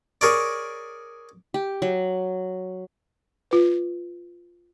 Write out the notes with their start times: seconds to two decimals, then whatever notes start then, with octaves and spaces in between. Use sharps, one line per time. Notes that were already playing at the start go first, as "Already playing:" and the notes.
0.21 G#4 A#4 C#5 D5
1.54 G4
1.82 F#3
3.51 F4 B4